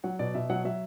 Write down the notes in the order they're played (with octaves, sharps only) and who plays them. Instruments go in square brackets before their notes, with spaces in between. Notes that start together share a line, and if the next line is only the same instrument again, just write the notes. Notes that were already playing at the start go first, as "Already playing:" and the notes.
[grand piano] F#3 F#5
B2 D5
B2 E5
F#3 F#5
F#3 E5